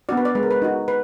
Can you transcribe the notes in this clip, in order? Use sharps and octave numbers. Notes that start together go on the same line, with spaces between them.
B3 D4 F#4 D5
B4
D5
G#3 B4
A#4
B4
D#4 F#4
B4